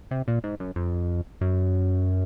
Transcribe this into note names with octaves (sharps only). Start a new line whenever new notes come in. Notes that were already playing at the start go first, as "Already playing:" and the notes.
C3
A#2
G#2
F#2
F2
F#2